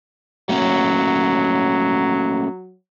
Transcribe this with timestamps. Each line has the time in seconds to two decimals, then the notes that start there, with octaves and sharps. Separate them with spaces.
0.49 F#3 A3 A#3 C#4